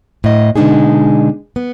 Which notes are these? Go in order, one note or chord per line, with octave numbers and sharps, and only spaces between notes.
A2 D#5
B2 D3 G#3 D4 D#4 G#4
B3